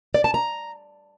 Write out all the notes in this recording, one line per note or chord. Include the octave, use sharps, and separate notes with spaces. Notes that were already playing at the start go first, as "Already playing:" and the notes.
D5
A5
A#5